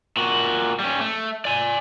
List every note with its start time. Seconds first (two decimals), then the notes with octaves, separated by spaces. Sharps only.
0.17 A#2 F#4
0.80 G3 C#4
1.01 A3
1.45 D5 G#5